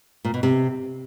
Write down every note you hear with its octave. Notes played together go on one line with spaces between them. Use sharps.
A#2
B2
C3